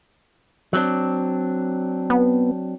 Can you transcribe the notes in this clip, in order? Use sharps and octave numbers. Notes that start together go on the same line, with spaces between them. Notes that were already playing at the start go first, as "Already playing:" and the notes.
F#3 C4 D4
B3